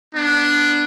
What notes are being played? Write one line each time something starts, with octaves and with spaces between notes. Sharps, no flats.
B3 D4